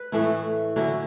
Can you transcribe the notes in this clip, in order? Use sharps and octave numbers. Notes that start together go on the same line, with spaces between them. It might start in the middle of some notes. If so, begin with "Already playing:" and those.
Already playing: B4
A2 E3 A3 E4
D3 F#3 C#4 E4